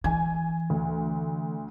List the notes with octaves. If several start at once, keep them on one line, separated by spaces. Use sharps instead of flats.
E3 G#5 G#6
D2